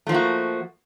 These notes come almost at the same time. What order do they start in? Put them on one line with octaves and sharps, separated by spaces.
A3 F3 A#3 F#4